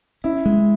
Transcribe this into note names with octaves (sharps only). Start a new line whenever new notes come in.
C#4 E4
G#3